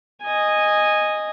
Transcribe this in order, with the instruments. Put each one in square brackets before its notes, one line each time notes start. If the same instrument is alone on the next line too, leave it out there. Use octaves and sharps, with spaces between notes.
[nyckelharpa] D#5 G#5